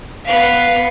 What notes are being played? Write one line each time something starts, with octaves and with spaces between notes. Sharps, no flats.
B3 F5